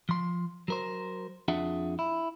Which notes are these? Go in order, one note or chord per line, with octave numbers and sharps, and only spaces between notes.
F3 C6
F#3 A#4 C5
F2 D4 F4 G#4 E5 F#5
E4